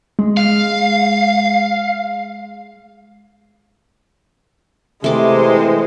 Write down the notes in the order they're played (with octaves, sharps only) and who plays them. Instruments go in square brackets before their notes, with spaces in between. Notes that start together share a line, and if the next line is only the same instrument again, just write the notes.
[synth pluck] G#3
[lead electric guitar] F5
[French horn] C3 [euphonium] E3 [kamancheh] G#3 C5 [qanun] A3 D6